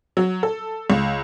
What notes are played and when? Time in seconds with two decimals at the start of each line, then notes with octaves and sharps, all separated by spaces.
0.17 F#3
0.43 A4
0.90 C#2